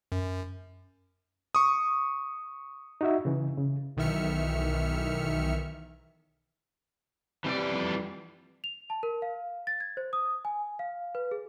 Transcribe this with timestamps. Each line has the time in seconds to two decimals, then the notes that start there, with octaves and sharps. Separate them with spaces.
0.12 F#2
1.55 C#6 D#6
3.01 D#4 F#4 E5
3.25 C#3 E3
3.57 C#3
3.97 B1 D#3 E3 E5 F6 C#7
7.44 C3 E3 G3 D5
7.72 F2
8.64 F7
8.90 A5
9.03 A#4
9.22 F5
9.67 A6
9.81 G#6
9.97 C5
10.13 D#6
10.45 G#5
10.79 F5
11.15 B4
11.31 G#4